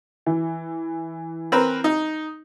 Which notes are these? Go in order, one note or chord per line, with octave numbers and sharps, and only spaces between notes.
E3
C4 A#4 B4
D#4